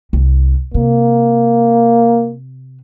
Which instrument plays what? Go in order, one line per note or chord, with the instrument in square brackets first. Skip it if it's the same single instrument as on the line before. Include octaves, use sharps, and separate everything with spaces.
[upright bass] C2
[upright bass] C3 [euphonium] A#3